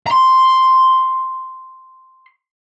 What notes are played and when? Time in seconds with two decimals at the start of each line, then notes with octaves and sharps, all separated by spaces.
0.07 A#5 C6